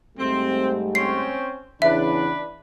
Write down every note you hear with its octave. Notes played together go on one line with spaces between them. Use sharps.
G#2 G3 A3 C4
C4 C#4 C5 C7
E2 C#3 E3 D4 B4 E5